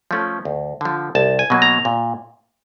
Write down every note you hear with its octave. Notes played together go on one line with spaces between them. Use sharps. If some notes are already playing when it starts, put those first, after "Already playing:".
F3 A3 C#4
D2
D3 F3
C2 A5
G#5
B2 F#3 A#3
A#5
A#2